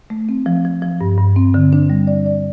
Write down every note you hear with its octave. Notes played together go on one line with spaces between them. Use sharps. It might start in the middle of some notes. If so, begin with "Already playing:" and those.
A3
C4
F3
F3
F3
G2
G2
C4
D3
D4
G3
D5
D5